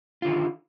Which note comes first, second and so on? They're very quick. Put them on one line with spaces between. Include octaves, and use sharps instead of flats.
F4 D3 D#3